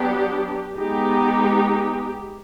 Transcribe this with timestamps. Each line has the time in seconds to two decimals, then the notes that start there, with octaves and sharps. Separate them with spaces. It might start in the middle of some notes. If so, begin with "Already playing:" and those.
Already playing: F#3 B3 D4 G4
0.77 G#3 B3 D#4 G4